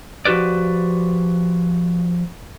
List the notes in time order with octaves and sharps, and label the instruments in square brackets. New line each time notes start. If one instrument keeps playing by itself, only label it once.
[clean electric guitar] F3 F#4 G4 B4 D5